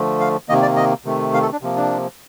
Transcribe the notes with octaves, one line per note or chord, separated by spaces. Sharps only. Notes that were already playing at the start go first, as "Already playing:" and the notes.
Already playing: D3 F3 A3
F5
C3 D#3 A#3 D#5
D5
D#5
C3 D#3 A3
F5
A4
D4
C3 F3 A#3
D4